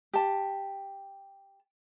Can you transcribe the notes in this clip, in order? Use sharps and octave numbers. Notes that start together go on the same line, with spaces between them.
G4 A5